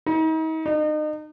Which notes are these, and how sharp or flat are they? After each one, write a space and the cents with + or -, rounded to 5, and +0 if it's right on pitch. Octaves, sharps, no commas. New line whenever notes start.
D#4 +40
D#4 -35